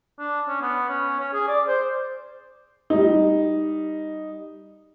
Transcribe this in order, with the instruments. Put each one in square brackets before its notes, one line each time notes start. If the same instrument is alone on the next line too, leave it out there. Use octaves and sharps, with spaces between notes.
[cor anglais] D4
C#4
B3
C#4
C#4
G#4
D5
C5
[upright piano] G3 D#4